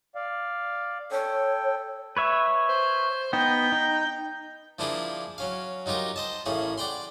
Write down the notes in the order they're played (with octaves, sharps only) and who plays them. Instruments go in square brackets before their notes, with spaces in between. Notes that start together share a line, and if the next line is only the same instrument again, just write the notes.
[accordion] D5 F5
[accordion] A4 G5 [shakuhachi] C#5
[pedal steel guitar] B4 C#5 E5
[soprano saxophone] C5
[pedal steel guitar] B3 D#4 [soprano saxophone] G5
[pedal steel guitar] D#4
[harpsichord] F3 A#3 D4 E4 F4 G#4
F#3 C#4 F5
F#3 D#4 F4 G4 A#4
C5 D#5 A5
A1 A2 A#3 C#4 G#4
D5 F#5 G5 B5 C6